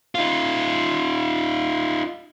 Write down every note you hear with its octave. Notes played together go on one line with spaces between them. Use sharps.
D#4 F4